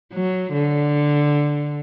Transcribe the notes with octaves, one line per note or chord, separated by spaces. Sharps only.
F#3
D3